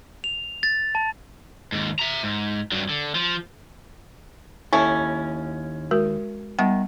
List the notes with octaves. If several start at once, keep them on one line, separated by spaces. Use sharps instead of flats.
F7
A6
A5
D#2 G#2
E5 A#5
G#2
G2 F#3
D3
F3
D#2 C#4 E4 A4
G#3 F#4 A#4
D#3 G3 B3 F#5